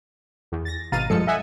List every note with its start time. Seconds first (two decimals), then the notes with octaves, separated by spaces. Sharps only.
0.52 E2
0.65 A6 A#6
0.92 G#1 B2 F5 A#5 A6 D#7
1.10 G2 F3 G#3 A4 C#7
1.27 D#5 E5 F#5 G#5